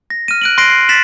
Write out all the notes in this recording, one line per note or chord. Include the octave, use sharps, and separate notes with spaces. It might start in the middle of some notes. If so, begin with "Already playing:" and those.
A#6
F6 D#7
F#6 D7 F#7
C6 F#6 A#6 C7 D7
C7
A6 B6 E7 F#7